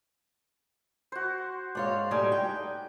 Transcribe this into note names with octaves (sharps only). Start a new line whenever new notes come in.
F#4 C5
G#2 C#5 D5 F5 C6
A2 G3 D#4 G#5 D6
G5